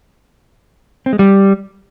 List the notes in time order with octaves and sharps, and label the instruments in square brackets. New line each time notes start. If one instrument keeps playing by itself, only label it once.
[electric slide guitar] C4
G#3
G3